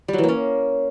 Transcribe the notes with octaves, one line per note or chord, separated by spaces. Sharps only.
G3
F#3
E3
A#3
C#4